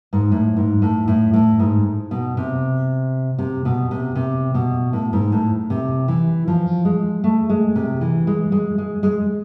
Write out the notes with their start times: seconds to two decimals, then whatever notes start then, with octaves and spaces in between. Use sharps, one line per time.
0.13 G#2
0.32 A2
0.57 G#2
0.82 A2
1.08 A2
1.33 A2
1.59 G#2
2.11 B2
2.37 C3
3.39 C3
3.65 B2
3.91 C3
4.15 C3
4.54 B2
4.93 A2
5.13 G#2
5.32 A2
5.70 C3
6.08 E3
6.48 F3
6.85 G#3
7.24 A3
7.49 G#3
7.76 C3
8.01 E3
8.27 G#3
8.52 G#3
8.78 G#3
9.03 G#3